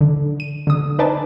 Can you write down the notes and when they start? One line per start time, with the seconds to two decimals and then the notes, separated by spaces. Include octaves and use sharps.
0.01 D3
0.40 D#7
0.67 D3 D#6
0.99 D#4 B4 C5 D5 G#5 A5